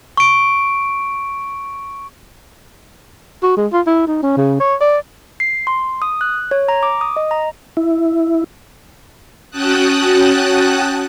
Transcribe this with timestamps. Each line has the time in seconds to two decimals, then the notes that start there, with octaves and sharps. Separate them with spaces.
0.17 C#6 D7
3.42 F#4
3.57 G#3
3.73 F4
3.87 E4
4.07 D#4
4.23 C#4
4.37 C#3
4.60 C#5
4.81 D5
5.40 C7
5.67 C6
6.02 D#6
6.21 F#6
6.51 C#5
6.68 A#5
6.83 D6
7.01 D#6
7.16 D#5
7.31 A#5
7.77 E4
9.51 C#4 F#4 G5 A5 D#6 F#6